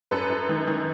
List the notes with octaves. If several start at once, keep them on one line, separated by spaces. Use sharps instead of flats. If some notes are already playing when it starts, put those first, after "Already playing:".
F#2 A4 B4
F#2
D#3
D#3